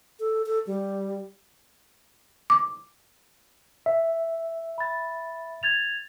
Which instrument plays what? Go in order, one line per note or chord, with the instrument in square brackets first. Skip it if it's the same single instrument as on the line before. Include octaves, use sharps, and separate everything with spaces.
[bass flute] A4
A4
G3
[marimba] D6
[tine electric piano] E5
[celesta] B5 A6
G#6 A6 F7